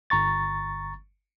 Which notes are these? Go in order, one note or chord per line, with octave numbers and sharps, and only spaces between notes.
G1 A#5 C#6 A6